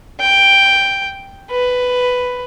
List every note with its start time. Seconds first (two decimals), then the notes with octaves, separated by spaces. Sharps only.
0.20 G5
1.51 B4